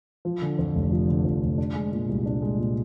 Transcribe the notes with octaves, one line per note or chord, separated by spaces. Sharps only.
F3
D3
F2
F1
F3
D3
F2
F1
D4
G#3
A#2
C2
D4
G#3
A#2